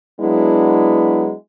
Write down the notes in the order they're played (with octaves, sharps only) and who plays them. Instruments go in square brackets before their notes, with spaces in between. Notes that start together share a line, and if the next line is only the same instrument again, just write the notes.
[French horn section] F#3 G#3 B3 D4 E4